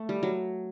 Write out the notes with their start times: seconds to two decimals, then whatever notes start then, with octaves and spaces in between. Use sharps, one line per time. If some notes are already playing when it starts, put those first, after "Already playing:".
Already playing: A3
0.09 G3
0.23 F#3